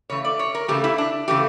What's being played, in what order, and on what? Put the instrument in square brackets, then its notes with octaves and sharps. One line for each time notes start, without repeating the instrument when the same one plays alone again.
[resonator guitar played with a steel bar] C#3 E3 A3 C#5
D5
C#5
A#4
C#3 E3 A3 G4
E4
D4
C#3 E3 A3 G4